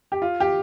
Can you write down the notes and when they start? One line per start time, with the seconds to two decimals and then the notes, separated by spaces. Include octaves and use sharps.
0.12 G4
0.22 F4
0.40 G4